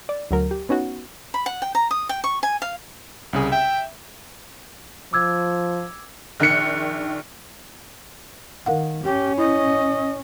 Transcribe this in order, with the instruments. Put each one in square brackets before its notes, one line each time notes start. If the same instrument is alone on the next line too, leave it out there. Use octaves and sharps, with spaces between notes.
[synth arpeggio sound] D5
D2 F#3 A#4
G4
B3 C#4 D#4 F#4
[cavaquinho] B5
F#5
G5
A#5
D#6
G5
C#6
G#5
F5
[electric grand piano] C2 C#3 G#4
[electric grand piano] E5 [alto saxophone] G5
[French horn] F3 [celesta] D6 E6 G#6
[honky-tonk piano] A#1 D#3 F#6 C#7
[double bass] D#3 [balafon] A#4 F5 F#5
[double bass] C#4 [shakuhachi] G4
[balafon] E4 [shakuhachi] D#5